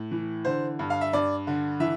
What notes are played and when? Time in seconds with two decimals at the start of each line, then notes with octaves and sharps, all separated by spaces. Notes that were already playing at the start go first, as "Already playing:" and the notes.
Already playing: A2
0.11 E3
0.45 D3 C5
0.79 G2
0.90 F5
1.01 E5
1.13 G2 D5
1.47 D3
1.80 E3 E5